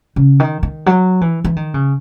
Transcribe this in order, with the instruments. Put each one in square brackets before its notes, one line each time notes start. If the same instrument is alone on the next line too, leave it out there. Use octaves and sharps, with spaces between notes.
[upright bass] C#3
D#3
D#3
F#3
E3
E3
D#3
C#3